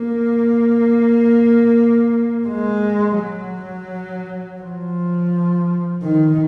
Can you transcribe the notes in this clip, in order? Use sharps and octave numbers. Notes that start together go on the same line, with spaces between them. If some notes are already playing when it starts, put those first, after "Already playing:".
Already playing: A#3
G#3
F#3
F3
D#3